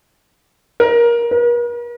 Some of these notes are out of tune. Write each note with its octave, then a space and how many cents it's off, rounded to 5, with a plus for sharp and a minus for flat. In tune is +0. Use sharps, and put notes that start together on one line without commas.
A#4 +20
A#4 +45